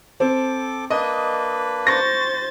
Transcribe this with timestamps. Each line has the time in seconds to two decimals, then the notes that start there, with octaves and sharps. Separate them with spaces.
0.20 C4 A4 D6
0.90 A#3 D4 B4 D#5
1.87 C5 C#6 A6 A#6